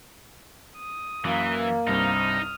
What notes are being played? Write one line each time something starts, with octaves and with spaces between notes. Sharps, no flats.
D#6
F#2 E3 A#3
C2 G2 C4 D#4 D#6 F6